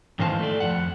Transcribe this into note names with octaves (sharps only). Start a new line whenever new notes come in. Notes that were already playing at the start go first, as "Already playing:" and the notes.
G#2 D#3 E3 C5 F5 A5
A3 D5
F2 F#5